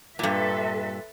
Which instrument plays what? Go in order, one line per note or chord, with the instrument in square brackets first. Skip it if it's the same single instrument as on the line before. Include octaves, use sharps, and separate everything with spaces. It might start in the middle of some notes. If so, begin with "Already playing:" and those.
[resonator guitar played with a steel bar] G2 A#2 [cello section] A4 B4 E5